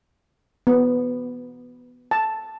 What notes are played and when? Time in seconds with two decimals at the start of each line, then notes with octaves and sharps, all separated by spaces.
0.67 B3
2.11 A5